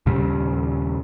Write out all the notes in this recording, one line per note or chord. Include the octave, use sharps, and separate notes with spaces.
D#2 A#2 C#3 G3